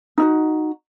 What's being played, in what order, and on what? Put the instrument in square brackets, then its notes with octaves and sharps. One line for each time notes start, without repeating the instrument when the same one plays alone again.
[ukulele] D#4 E4 F#4